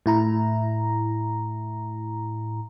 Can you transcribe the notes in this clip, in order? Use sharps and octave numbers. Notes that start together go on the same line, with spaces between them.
A2 E4 A#5